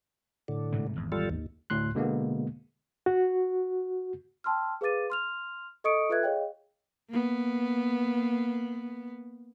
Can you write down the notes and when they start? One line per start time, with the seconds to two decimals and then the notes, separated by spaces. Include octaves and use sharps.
0.48 A2 D3
0.72 G#2 C3 A3
0.96 G#1 E2
1.12 G3 F4 A4
1.29 D#2
1.70 D2 A2 C6 F#6
1.95 B2 D3 G#3 A#3 B3
3.06 F#4
4.44 G5 A5 C6 E6 F6
4.81 G#4 B4 F5 D6 A6 D#7
5.10 C6 F6 F7
5.84 A4 D#5 C#6 D#6 C#7 D7
6.09 F4 A4 B4 E5 F#6 G#6
6.23 G#4 C#5 D#5 F5 G5
7.09 A#3 B3